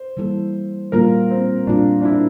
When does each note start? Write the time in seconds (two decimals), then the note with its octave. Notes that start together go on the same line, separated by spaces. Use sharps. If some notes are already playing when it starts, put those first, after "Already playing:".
Already playing: C5
0.17 E3 G3 A#3 E4 A4
0.92 A#2 G3 A#3 F4 A#4
1.30 C4
1.67 A#2 G3 A#3 D4 F4
2.01 D4
2.05 E4